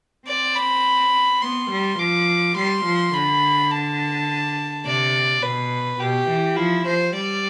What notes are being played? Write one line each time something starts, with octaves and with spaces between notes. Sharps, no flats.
C4 D5
B5
B3 C6
G3
F3 D6
G3 C6
F3
D3 B5
A5
C3 D5
B2 B4
B2 G4
E3
F3 E4
F3 C5
G3 D5